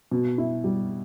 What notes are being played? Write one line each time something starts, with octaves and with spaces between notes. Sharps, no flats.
B2
E4
G3